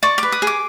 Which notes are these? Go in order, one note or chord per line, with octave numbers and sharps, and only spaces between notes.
D5 C#6
B4 D6
D#6
G#4
D6